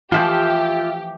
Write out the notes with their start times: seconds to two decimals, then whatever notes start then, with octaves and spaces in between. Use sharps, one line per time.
0.12 E3 F3 A3 F4 G4 E5 G6